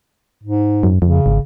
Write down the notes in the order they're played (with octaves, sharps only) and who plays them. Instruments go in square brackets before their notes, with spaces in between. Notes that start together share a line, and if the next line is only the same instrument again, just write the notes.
[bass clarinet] G#2
[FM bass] F#2
[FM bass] F2 [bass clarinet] C#3
[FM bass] G#1